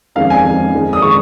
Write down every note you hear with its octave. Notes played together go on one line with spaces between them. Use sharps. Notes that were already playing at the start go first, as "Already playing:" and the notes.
F2 D#3 G#3 F5
G#5
F2 D#3 G#3
F2 D#3 G#3
D#6
D#3 G#3 C#6